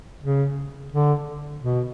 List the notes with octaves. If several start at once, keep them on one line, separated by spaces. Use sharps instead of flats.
C#3
D3
B2